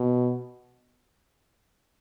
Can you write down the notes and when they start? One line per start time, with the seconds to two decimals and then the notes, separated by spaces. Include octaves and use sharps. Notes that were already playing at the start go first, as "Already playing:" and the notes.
Already playing: B2